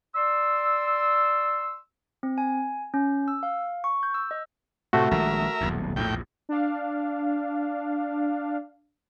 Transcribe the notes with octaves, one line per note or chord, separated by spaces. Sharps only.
D5 C6 E6
C4
G#5
C#4
E6
F5
C#6
G6
E6
D#5
A2 C3 A3 F#4
A#1 D#3 G#3 A#4 E5
D#1 B1 E2
A#1 E2 A2 G5
D4 F5